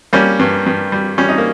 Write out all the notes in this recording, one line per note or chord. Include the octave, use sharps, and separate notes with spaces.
G3 A#3 C#4
G2
G2
G3
G3 C#4
D#4
A#3